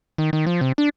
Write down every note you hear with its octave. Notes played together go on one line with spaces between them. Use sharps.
D#3
D#3
F3
C3
D4